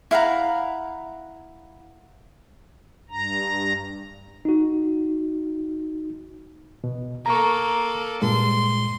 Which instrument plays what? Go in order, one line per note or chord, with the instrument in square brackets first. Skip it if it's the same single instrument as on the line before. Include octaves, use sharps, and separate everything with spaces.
[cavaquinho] E4 F5 F#5 A#5
[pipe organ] G2 A#5
[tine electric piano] D#4 F#4
[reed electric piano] B2
[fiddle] A#3 A4 [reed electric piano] A#5 C#6
[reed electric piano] G2 A#2 G#3 [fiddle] C6